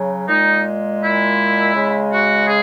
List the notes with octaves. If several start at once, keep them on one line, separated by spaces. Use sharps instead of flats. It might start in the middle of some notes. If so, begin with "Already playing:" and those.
Already playing: C#3 F#3
A#2 G#3 D#4
E4
C#3 G#3
F#4
G#4